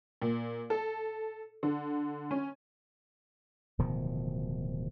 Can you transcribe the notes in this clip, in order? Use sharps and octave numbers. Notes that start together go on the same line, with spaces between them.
A#2
A4
D3
C#4
D1 B2 D#3 F3